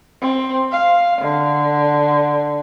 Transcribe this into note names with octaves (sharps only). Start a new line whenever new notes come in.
C4
F5
D3